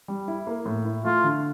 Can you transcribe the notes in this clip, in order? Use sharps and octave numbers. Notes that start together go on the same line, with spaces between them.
G3
E4
A#3
A2
E4
A3 F4
D3